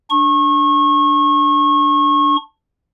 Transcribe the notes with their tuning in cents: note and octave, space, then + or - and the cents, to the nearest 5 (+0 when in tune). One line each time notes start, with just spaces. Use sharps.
D4 +0 C#6 -30